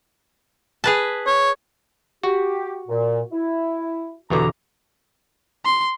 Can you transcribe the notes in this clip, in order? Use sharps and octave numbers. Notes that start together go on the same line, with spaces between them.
G#4 B4 A5
C#5
F#4 G4
A#2
E4
E2 G2 B2 D3 A#5
C6